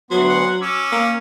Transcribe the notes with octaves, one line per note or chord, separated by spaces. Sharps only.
D2 F#3 B3 C6
F#5
C#4 D6 E6
A#3